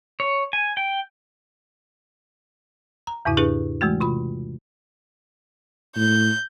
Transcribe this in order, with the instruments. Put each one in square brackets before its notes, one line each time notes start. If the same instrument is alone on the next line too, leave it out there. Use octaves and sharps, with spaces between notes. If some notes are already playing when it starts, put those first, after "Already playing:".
[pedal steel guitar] C#5
G#5
G5
[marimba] A#5
E2 G#2 C#3 E4
D4 E4 G4 G#4 B4
E3 G#3 A3 F#4
C3 F4 B5
[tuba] A2 [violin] G6